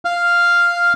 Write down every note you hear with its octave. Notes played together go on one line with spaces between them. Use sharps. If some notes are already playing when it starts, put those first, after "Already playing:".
F5 F6